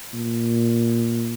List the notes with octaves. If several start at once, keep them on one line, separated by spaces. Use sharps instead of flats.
A#2